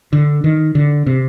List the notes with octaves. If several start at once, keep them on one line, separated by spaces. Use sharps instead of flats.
D3
D#3
D3
C3